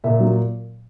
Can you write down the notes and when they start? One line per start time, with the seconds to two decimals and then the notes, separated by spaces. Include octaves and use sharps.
0.04 A#2 E5
0.20 F#3